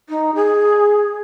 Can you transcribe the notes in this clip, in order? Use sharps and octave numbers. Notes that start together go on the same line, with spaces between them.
D#4
G#4